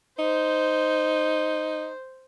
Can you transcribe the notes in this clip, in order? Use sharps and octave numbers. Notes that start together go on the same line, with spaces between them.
D#4 C5